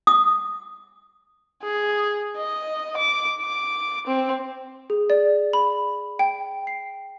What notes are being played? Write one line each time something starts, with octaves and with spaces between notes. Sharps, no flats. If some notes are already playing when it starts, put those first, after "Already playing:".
D#6
G#4
D#5
D6
D6
C4
G#4
D5
B5
G5
C7